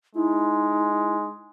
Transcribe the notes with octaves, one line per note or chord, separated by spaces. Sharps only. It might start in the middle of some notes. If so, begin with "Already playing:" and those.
G#3 D#4 E4